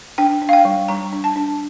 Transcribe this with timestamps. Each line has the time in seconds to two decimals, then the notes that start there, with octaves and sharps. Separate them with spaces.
0.18 D4 G5
0.42 D4
0.49 F5
0.53 G5
0.65 G3
0.88 G3 A#5
1.12 D4
1.24 A5
1.36 D4